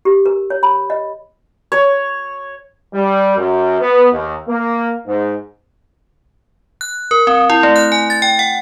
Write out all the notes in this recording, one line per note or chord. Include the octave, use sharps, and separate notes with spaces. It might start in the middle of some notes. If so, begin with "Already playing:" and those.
G4
A#4
C#5
B5
D#5
C#5
G3
F#2
B3
D#2
A#3
G#2
F#6
A#4
C4
E4
A3
F#6
G#5
A6
G5
F#5